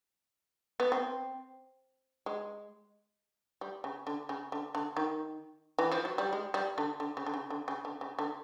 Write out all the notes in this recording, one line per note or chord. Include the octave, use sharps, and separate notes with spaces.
B3
C4
G#3
G3
C#3
D3
C#3
D3
D3
D#3
E3
F3
F#3
G3
G#3
G3
D3
D3
C#3
D3
C#3
D3
C#3
D3
C#3
D3